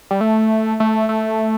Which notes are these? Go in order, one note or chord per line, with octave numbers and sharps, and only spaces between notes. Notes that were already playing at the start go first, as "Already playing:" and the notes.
G3
A3
A3
A3